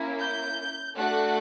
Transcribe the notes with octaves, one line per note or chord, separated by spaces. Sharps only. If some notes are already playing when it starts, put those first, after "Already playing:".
Already playing: A#3 C#4 E4
G6
A3 D4 F#4 A4 F#6